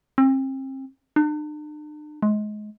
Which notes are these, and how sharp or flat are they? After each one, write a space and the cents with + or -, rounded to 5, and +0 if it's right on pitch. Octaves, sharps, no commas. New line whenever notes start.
C4 +35
D4 +45
G#3 +25